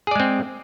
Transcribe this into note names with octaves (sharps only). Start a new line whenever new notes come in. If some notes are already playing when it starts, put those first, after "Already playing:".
G#3 C4 G#4 D5